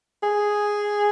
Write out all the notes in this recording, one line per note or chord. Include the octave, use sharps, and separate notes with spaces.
G#4